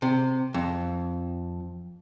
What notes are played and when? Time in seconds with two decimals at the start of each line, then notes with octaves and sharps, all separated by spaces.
0.02 C3
0.54 F2